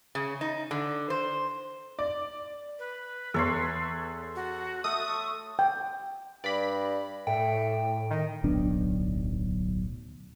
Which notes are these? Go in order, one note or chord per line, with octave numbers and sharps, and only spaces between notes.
C#3
D#4
D3
C5
D5
B4
E2 A4 C#5 C6
F#4
A3 C#6 D#6
G5
G2 D5 B5
A2 A3 G5
D#3 D#4
D1 B1 B3 D4